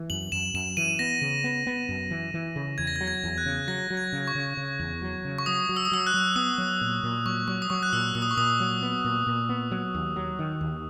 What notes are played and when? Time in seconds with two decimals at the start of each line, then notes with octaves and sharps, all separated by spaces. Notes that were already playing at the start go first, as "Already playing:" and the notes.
Already playing: E3
0.10 F#2 F#7
0.32 F#2 E7
0.54 F#2 E7
0.77 E3 D#7
0.99 B3 A#6
1.21 C#3
1.44 B3
1.67 B3
1.89 F#2
2.11 E3
2.34 E3
2.56 C#3
2.78 E2 G#6
2.87 A#6
2.96 G#6
3.01 F#3
3.08 G#6
3.24 E2
3.38 F#6
3.46 C#3
3.68 F#3 A#6
3.90 F#3
3.97 G#6
4.13 C#3
4.28 C#6
4.35 C#3
4.57 C#3
4.79 E2
5.02 F#3
5.25 C#3
5.38 C#6
5.46 F#3 D#6
5.69 F#3
5.76 E6
5.85 D#6
5.92 F#3 E6
6.07 F#6
6.14 F#3
6.36 B3 D#6
6.58 F#3
6.81 A#2
7.03 A#2
7.25 F#3 C#6
7.48 F#3 C#6
7.62 D#6
7.70 F#3 C#6
7.83 F#6
7.93 A#2 E6
8.15 A#2 E6
8.22 D#6
8.31 C#6
8.37 A#2 D#6
8.60 F#3
8.82 B3
9.04 A#2
9.27 A#2
9.49 B3
9.71 F#3
9.95 D#2
10.16 F#3
10.39 D#3
10.61 D#2